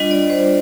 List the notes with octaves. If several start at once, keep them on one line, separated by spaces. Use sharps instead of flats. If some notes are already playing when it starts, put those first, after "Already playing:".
Already playing: G3 D4 F4 D#5
D5
C5